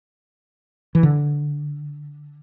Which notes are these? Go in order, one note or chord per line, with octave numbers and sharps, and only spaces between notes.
E3
D3